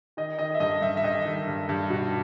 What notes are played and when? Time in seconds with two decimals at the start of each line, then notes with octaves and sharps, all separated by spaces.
0.17 D#3 D#5
0.39 D#3 D#5
0.54 E5
0.60 G2 D#5
0.82 G2 E5
0.97 E5
1.04 G2 D#5
1.25 D#3
1.48 G2
1.69 G2
1.90 B2